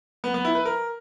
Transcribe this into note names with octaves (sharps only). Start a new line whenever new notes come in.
B3
B3
E4
B4
A#4